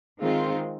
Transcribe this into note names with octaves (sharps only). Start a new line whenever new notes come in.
D#3 G#3 C4 F4